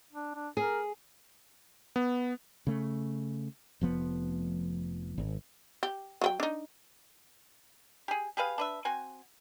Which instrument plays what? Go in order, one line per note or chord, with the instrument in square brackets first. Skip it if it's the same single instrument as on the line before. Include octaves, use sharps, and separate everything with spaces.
[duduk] D4
D4
[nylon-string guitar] G#4 [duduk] A#4
[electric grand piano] B3
[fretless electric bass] C#3 A3
F1 F3 B3
G#1
[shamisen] G4
F#3 F4 G5
D4 D#4
[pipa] G4 G#4
G4 G#4 B4 F5
D4 B4 E5
C4 F#4 G#5